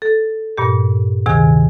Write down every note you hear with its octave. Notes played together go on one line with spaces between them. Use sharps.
A4
G2 A#2 G4
D2 C3 D#3 G#4 G#5 G#6